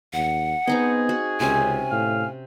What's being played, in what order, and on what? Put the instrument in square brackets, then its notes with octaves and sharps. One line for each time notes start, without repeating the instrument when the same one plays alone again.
[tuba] D#2 [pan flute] F#5
[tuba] B3 [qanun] C4 D#4 D#5 [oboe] G#4
[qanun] F#4
[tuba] C#2 [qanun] C3 C4 C#4 [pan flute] G#5
[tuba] A2 [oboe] F5